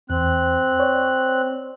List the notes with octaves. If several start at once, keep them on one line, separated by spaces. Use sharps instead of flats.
E2 C4 F#6
C#5 D5